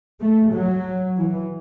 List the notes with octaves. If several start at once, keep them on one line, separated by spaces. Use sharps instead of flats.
A3
F#3
E3